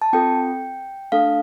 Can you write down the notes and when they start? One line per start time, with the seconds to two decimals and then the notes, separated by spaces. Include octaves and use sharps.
0.02 A5
0.13 C4 F4 A4 G5
1.12 A3 D4 A4 F5